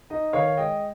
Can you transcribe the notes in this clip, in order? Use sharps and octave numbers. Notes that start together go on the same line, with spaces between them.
D#4 D#5
D#3 C#5 F5
G#3 D#5 G5